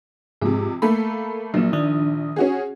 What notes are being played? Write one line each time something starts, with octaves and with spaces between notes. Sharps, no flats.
F2 G#2 C3 G#4
A3 A#3 A4 B5
A#1 F#3 A#3
D#3 D4 D#6
C#4 F#4 G#4